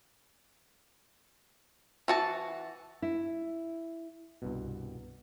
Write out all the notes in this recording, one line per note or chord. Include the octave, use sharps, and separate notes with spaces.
E3 F#4 A5
E4
C2 G2 B2